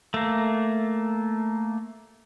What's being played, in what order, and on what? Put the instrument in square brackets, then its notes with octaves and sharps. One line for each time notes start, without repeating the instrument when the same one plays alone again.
[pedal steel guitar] A3 A#3